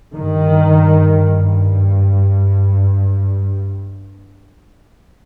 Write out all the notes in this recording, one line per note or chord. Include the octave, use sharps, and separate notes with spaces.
G2 D#3